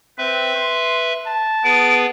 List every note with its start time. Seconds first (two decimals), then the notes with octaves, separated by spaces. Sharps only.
0.18 C4 B4 E5
0.56 C6
1.27 A5
1.64 B3 G#4 B4 D7